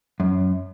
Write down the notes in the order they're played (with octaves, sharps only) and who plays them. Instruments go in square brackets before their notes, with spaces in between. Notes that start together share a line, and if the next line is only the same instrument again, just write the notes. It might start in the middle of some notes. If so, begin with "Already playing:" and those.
[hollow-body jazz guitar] F#2